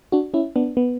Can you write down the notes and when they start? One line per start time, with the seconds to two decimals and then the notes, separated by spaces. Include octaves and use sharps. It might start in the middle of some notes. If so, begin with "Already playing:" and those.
0.12 D4 F#4
0.34 C#4 E4
0.56 B3 D4
0.77 B3